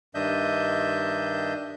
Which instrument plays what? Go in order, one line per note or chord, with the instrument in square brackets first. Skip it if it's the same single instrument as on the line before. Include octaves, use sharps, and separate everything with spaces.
[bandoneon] G2 D#3 D4 D#5 E5 G6